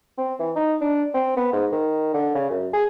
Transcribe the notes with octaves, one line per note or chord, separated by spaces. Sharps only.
C4
E3
D#4
D4
C4
B3
G#2
D#3
D3
C#3
F#2
G#4